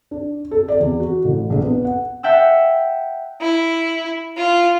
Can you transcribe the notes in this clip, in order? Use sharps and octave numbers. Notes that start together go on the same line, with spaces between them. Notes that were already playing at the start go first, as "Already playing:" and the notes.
D4
A4
D5
E2
F#4
A1
A#1
B3
F#5
E5 F#5 G5 A5 E6
E4
F4